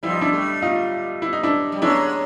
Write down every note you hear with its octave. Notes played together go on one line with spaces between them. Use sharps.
F3 G3 E4
D#4
D4 E4
G3 A3
D#4 F4
E4
D#4
D4 E4
G3
F#3 G#3 D4 E4